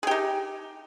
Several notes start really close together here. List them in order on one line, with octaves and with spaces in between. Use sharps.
G#4 G4 D#4